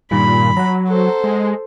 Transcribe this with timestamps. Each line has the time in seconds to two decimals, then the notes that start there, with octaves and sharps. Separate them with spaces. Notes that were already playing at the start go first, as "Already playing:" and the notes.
0.11 G2 A#2 D#3 G3 B5
0.57 F#3 F#5 A#5
0.88 A4 C5
1.24 G#3